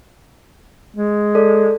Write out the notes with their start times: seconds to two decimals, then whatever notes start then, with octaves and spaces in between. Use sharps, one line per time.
0.97 G#3
1.35 A4 D5